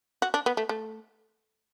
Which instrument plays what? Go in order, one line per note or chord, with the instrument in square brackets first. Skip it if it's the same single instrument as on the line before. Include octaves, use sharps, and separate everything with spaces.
[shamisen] F#4
D4
B3
A3
A3